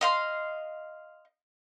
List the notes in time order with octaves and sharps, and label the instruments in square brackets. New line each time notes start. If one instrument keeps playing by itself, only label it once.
[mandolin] D#5 F5 C6